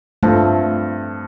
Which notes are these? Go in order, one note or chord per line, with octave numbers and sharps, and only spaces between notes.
G2 F3 A3 C4